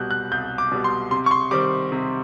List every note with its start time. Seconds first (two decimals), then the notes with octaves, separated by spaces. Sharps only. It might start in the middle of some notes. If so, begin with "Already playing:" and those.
Already playing: C2 B2 G3 F#6 G6
0.11 F#6
0.31 C2 G6
0.58 D6
0.72 B2 G3
0.84 C6
1.11 C3 C6
1.26 C#6
1.31 C6
1.51 D#3 G3 C4 D6
1.92 C3